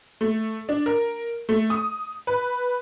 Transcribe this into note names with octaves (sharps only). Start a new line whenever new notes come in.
A3
D4
A#4
A3
D#6
B4